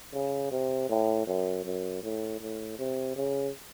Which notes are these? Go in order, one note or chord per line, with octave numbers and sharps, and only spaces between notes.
C#3
C3
A2
F#2
F#2
A2
A2
C3
C#3